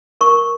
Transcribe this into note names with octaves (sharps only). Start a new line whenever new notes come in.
A#4 C#6